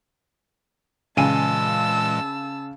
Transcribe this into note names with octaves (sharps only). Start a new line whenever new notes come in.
A#2 C#3 E3 G#3 G#5 A5 E6 D#7